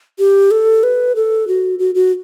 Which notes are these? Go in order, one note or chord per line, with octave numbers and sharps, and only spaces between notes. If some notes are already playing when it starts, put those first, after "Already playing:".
G4
A4
B4
A4
F#4
F#4
F#4